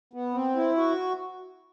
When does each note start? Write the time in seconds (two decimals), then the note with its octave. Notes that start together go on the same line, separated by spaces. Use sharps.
0.13 B3
0.34 C4
0.56 E4
0.77 F#4